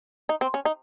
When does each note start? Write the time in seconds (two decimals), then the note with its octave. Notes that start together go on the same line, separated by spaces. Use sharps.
0.29 D#4
0.41 C4
0.54 C#4
0.65 D#4